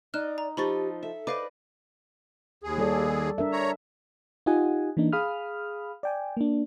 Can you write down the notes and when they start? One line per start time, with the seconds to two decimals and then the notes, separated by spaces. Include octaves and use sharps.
0.14 D#4 D5 F6 F#6 E7
0.38 A#5
0.57 F3 D#4 G4 A4 B5 C#6 A6
1.03 A4 E5
1.27 B4 C5 D5 D#5 F5 D6
2.63 D#2 G#4
2.78 G3 A4 D5
3.38 D4 A#4 E5
3.53 C#5 A#5
4.46 D#4 F4 G4 D#5 F#5 G#5
4.97 E3 A#3 D4 D#4
5.13 G#4 F5 B5 D#6 F6
6.03 D5 G5 G#5
6.37 A#3 D4